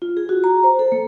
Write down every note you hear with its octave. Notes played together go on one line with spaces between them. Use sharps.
F4
G#4
F#4
A#5
C5
A4
A#3